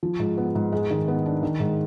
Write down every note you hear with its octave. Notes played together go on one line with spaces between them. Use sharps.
F3
G#2
B3
G#2
G#3
D#3
B3
D4
D#3
G#2